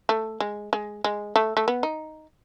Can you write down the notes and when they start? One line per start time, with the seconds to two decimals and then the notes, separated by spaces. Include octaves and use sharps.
0.09 A3
0.40 G#3
0.73 G#3
1.04 G#3
1.36 A3
1.57 A3
1.68 B3
1.83 D#4